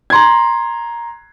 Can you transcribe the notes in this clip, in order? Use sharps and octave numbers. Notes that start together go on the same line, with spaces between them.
A#5 C6 G#6